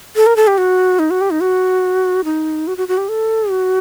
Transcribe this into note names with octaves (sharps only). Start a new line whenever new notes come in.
A4
A#4
A4
G4
F#4
D#4
F#4
G4
D#4
F#4
D#4
F#4
F#4
F#4
G4
A4
F#4